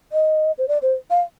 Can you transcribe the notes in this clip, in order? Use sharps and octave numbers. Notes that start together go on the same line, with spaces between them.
D#5
C5
D5
C5
F5